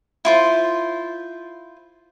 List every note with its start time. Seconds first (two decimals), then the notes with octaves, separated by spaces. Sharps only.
0.25 E4 F4 C5